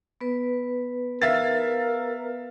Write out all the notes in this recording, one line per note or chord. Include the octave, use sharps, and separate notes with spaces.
B3 B4
A#4 E5 F5 A6